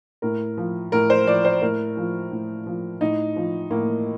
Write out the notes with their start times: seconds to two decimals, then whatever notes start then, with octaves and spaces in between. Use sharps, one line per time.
0.22 A2 A#4
0.57 F3
0.92 A2 A#4
1.10 C5
1.27 F3 D5
1.45 C5
1.62 A2 A#4
1.97 F3
2.31 A2
2.66 F3
3.01 A2 D#4
3.36 F3
3.70 A2 A#3